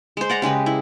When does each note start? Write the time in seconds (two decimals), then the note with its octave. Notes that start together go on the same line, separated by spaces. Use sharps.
0.17 G#3 C5
0.30 D5 F#5 A#5
0.42 C#3 G#3 G4 B4
0.66 E4